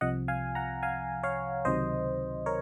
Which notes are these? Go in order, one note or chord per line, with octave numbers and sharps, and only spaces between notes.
C2 C3 F3 D#5 F#5
F5 G#5
F#5 A#5
F5 G#5
C#5 F5
C#2 C3 D#3 F#3 C5 D#5
A#4 C#5